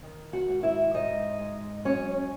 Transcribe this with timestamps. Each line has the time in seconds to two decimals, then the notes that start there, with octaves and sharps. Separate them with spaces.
0.03 D#3
0.33 F#4 F#5
0.48 G#2
0.63 E4 E5
0.94 G#2 D#4 D#5
1.39 G#3
1.85 F#3 C#4 C#5